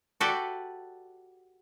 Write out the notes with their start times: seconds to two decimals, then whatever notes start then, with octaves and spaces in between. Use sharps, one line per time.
0.21 F#4 G4 A4 B4 D5